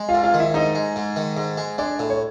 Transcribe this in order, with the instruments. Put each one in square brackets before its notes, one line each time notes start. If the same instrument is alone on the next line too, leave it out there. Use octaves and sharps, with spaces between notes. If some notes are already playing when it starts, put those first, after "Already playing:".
Already playing: [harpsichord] G#3
[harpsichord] G#2 [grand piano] F4 F5
[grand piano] F4 F5
[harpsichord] D#3
[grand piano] E4 E5
[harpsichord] G#2 [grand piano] D#4 D#5
[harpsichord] G#3
G#2
D#3
G#2
G#3
[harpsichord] G#3 [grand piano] D4 D5
[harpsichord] A2
[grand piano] C#5